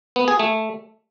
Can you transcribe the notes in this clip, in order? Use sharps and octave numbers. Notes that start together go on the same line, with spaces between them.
B3
G#4
A3